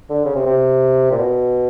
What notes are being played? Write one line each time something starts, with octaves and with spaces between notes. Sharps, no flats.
D3
C#3
C3
C3
A#2
B2